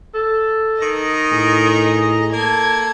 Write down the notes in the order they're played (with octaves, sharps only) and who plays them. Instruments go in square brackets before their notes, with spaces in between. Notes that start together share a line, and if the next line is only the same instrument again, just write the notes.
[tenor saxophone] A4
[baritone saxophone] D#3 [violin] D#5 A#5
[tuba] A2 [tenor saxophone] G#4
[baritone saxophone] A#3 [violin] A4 G#6